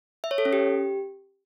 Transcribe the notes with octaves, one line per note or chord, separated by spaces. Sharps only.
E5
C#5
A4
C#4
G4